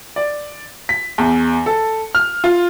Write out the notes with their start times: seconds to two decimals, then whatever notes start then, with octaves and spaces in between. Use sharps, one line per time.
0.16 D5
0.89 B6
1.18 E2
1.66 A4
2.15 F6
2.44 F4